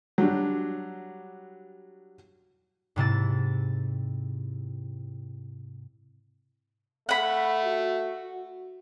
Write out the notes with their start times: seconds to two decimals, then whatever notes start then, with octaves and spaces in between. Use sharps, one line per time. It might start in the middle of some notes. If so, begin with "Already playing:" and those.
0.18 F#3 G3 D4
2.96 G#2 C3 E4 A6
7.09 A3 F#5 B5
7.64 F#4